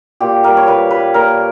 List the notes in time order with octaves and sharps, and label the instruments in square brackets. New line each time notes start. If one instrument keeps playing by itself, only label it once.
[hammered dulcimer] A#2 G4
G3 A#4
C#5
A#2 B4
G3 B4
A#2 A#4